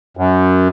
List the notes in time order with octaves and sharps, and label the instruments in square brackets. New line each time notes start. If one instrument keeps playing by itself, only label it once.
[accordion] F#2